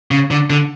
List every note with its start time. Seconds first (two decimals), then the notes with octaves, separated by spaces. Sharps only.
0.11 C#3
0.31 D3
0.50 D3